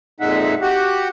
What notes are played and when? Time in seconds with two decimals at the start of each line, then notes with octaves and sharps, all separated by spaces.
0.20 F2 A#2 G#3 D#4 E5 F#5
0.62 F#4 G4 F#5